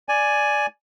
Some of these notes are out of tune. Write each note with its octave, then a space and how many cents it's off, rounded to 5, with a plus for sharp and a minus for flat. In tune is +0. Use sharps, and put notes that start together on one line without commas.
D5 +0 G#5 +5